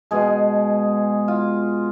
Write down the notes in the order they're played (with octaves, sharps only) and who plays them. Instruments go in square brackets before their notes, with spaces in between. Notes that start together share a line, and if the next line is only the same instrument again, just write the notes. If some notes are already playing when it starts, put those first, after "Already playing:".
[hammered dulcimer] B2 G#3 G#4
F4